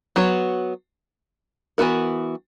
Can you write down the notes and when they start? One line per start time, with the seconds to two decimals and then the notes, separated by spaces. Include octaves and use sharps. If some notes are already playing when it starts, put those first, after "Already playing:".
0.16 F#3 B3 F#4 C#5
1.78 E3 B3 F#4 A#4